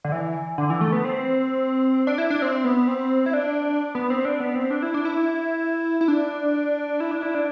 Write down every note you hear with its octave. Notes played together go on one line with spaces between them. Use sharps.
D3
E3
D3
E3
A3
B3
C4
D4
E4
D4
C4
B3
C4
E4
D4
B3
C4
D4
B3
C4
D4
E4
D4
E4
E4
D4
E4
D4
E4
D4